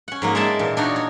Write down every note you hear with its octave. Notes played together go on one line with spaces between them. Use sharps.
C#4 F#5
G#2 F#3 A#3
G#3 A#4 D5 E5 A5
A#2 E3
D4 D#4 F#4 C#5
C#5